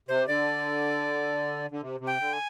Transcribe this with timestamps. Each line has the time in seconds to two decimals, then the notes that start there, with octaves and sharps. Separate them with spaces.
0.08 C3 C5
0.27 D3 D5
1.71 D3
1.82 C3
2.00 C3
2.07 G5
2.21 D3
2.33 G#5